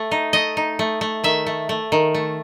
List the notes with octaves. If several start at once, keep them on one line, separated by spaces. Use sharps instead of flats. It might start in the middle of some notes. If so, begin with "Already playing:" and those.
Already playing: A3
D#4
A3 D#5
D#4
A3
A3
D#3 E5
A3
A3
D#3
A3